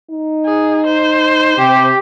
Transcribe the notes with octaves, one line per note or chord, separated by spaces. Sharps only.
D#4
G#4
C5
C3 G4